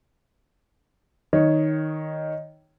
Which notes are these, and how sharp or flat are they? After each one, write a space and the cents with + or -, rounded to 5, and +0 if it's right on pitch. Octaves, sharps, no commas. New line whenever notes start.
D#3 +0 C#5 +0